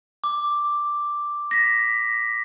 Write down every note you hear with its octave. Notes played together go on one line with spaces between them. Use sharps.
D6
A#6 B6